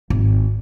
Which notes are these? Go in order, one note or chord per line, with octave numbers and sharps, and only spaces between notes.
G#1